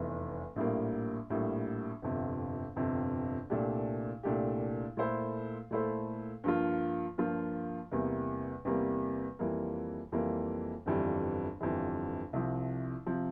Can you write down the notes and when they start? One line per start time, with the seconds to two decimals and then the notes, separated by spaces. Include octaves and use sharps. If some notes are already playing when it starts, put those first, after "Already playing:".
Already playing: F1 E2 E3
0.56 A#1 A2 G3 A#3
1.30 A#1 A2 G3 A#3
2.02 G1 F2 C3
2.76 G1 F2 C3
3.50 C2 A#2 A3 D4 G4
4.23 C2 A#2 A3 D4 G4
4.97 A#2 A3 E4 A4 C5
5.71 A#2 A3 E4 A4 C5
6.44 G2 F3 A#3 F4
7.18 G2 F3 A#3 F4
7.91 E2 C3 G3 A#3
8.65 E2 C3 G3 A#3
9.39 F2 E3 G3 A#3
10.12 F2 E3 G3 A#3
10.86 G1 F2 E3 G3
11.60 G1 F2 E3 G3
12.33 C2 C3 F3
13.06 C3 F3